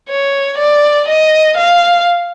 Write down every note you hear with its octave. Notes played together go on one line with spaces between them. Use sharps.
C#5
D5
D#5
F5